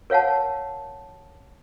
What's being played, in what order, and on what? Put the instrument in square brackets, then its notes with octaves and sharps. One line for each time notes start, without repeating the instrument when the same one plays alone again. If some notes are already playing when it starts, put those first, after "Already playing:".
[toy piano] A#4 C#5 F5 F#5 A5